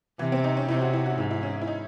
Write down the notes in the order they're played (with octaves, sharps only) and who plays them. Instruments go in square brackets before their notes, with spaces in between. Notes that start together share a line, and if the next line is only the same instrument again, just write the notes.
[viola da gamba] C3 [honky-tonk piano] E3
[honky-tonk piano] C4
D#4
C#4
[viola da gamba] C3 [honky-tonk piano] E4
[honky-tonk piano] F#4
E4
F#4
[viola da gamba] G#2 [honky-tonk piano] E4
[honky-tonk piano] E4
C#4
E4
D#4